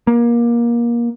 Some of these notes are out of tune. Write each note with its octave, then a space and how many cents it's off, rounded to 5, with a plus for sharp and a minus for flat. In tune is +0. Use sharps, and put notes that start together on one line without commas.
A#3 +25